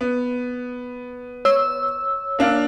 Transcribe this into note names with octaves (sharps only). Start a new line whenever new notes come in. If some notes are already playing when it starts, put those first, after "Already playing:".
B3
C#5 E6
A#3 D4 F5